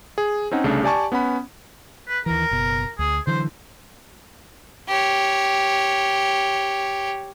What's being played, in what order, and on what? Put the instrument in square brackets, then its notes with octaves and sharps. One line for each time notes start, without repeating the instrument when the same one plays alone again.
[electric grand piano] G#4
C4 C#4 D#4 F#5
C2 C#3 A3 D4
G4 D5 G#5 A5 C#6
B3 C#4 F#5 B5
[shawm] B4
[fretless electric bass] D#2 E3 [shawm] A#4
[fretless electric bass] F#1 B2
[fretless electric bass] D2 [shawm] G#4
[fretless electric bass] D3 E3 F#3 [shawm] C5
[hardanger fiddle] G4 C#5